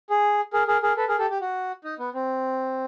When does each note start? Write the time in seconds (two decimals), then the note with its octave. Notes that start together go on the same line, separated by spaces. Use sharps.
0.10 G#4
0.53 G#4 A#4
0.67 G#4 A#4
0.83 G#4 A#4
0.97 A4 B4
1.08 G#4 A#4
1.18 G4 A4
1.30 G4
1.41 F#4
1.84 D#4
1.99 B3
2.14 C4